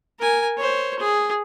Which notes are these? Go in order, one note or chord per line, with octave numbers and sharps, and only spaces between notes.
A#4 G#5
C5 C#5
G#4